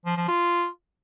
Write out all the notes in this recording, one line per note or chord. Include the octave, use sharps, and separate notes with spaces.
F3
F3
F4